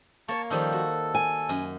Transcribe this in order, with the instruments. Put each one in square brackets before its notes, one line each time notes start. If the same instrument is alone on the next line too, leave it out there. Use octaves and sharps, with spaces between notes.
[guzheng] A#3 C#5 [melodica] A5 C#6
[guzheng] D#3 F3 G3 [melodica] A4
[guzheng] F#4
[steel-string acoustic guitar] G#5
[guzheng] F#2